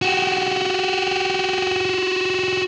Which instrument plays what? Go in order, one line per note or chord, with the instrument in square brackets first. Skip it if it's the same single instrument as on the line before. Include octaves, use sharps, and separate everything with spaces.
[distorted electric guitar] F#4 G4